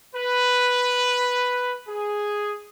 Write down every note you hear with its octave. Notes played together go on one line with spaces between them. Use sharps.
B4
G#4